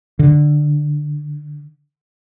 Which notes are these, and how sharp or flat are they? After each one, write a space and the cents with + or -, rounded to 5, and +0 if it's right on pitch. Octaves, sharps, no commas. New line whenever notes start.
D3 +15